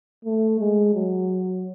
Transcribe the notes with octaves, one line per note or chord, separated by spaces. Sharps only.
A3
G#3
F#3